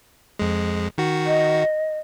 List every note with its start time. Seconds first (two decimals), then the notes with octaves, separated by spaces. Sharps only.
0.39 F2 G#3
0.98 D#3 F#4
1.26 D#5